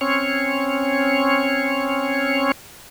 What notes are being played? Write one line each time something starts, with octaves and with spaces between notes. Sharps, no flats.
C4 C#4 C#5